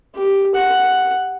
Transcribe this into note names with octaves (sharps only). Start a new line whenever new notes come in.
G4
F#5